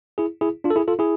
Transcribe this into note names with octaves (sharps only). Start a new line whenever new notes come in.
E4 G#4
E4 G#4
D4 F4
A4
E4 G#4
F4 A4
E4 G#4